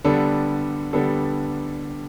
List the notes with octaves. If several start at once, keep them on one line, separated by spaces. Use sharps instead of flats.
D3 G3 B3 D4 A4
D3 G3 B3 D4 A4